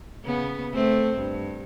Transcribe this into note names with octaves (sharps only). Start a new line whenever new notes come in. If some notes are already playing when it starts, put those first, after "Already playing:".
C#3 B3
A3 C4
G2